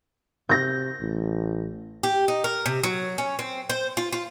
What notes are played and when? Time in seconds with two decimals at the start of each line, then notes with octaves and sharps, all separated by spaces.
0.49 C3 G6 A#6
1.01 A1
2.03 G4
2.28 D#4
2.44 A#4
2.66 C3
2.83 F#3
3.18 C#4
3.39 C4
3.70 C5
3.97 F4
4.12 F4